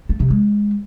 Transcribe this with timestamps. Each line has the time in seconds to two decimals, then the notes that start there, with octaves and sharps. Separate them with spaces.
0.09 A3
0.20 C3
0.30 G#3